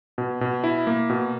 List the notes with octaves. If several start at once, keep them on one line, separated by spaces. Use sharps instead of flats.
B2
B2
E4
A#3
B2